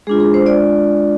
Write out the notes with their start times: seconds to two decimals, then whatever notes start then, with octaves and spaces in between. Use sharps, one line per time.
0.07 G#3 D4 F4 G#4
0.20 G#4
0.34 C5
0.46 D5